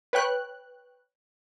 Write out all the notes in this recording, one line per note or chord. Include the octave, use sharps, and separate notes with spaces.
B4 C#5 G5 F#6